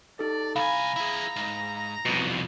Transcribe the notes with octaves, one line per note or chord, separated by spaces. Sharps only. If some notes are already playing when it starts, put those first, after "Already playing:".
D#4 G4 A4 D5
C2 F5 G#5 A#5 B5
E4 G#4
G#2
C2 F2 B2